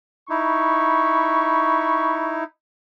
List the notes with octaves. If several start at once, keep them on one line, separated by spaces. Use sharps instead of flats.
D#4 E4 B5 C#6